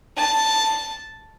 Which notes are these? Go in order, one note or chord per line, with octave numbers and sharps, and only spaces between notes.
A5